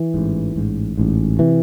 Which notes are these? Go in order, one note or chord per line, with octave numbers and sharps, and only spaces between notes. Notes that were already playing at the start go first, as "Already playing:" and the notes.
Already playing: E3
A1 G#2
A1 G#2
A1 G#2
C3 E3